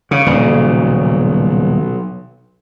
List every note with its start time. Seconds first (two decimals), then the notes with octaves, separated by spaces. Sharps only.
0.11 C#3
0.26 D#1 B1 F2 C#3